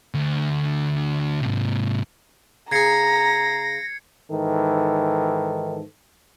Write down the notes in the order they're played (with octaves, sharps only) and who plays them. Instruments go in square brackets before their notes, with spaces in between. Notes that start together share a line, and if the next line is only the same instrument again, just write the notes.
[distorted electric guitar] D2
G#2 C3
[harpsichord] C#3 G#4 [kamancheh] A#5 [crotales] G#6 C7 C#7 [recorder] A#6
[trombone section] G#2 D#3 E3 A4